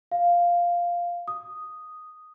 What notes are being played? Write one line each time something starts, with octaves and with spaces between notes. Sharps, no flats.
F5
D#6